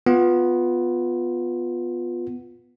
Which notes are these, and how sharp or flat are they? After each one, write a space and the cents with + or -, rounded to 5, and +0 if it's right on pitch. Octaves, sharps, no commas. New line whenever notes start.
B3 +0 F4 +15